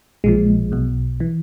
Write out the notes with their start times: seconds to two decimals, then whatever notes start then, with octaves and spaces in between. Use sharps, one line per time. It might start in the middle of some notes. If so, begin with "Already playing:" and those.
0.24 A#1 A#2 F3 G#3
0.72 B1 B2
1.20 E3